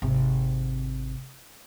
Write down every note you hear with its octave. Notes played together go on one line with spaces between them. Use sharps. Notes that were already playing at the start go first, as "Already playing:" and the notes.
G#1 C3